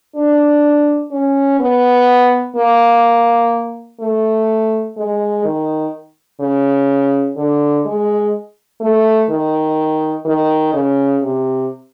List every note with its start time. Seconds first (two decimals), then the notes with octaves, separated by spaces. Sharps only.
0.16 D4
1.12 C#4
1.60 B3
2.56 A#3
4.00 A3
4.97 G#3
5.45 D#3
6.40 C#3
7.37 D3
7.85 G#3
8.81 A3
9.30 D#3
10.25 D#3
10.74 C#3
11.23 C3